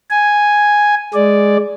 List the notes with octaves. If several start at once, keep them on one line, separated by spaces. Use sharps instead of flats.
G#5
G#3 D5